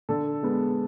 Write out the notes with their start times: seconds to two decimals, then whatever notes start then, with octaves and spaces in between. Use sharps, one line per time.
0.09 D3 A4
0.43 G#3 B3